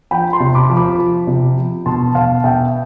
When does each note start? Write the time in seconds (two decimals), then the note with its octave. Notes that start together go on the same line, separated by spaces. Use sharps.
0.11 F3 G5 B5
0.33 A5 C6
0.40 C3
0.55 B5 D6
0.69 F3
0.77 B5 D6
0.99 F3
1.27 C3
1.57 F3
1.86 B2 A5 C6
2.15 B2 F5 A5
2.44 B2 E5 G5